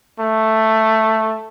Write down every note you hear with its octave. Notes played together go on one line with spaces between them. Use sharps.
A3